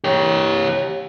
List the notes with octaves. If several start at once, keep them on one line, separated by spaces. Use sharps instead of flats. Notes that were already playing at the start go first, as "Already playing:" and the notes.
G4 C#5